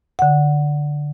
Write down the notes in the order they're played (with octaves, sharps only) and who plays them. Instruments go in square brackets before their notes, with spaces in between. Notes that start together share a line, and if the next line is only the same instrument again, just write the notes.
[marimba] D3 F#5